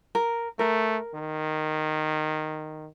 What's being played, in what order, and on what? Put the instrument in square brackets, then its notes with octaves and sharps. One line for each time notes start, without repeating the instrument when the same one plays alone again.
[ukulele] A#4
[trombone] A3 [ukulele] A#4
[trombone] D#3